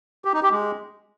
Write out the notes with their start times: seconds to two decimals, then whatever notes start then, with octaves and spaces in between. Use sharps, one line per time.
0.25 G4
0.34 D#4
0.43 G4
0.52 G#3